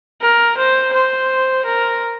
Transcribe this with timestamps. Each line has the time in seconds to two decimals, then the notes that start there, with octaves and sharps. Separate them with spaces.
0.21 A#4
0.57 C5
0.93 C5
1.65 A#4